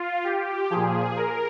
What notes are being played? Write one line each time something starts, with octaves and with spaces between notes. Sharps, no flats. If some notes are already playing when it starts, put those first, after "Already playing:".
Already playing: F4
G4
A#2 F3 G#4
A#4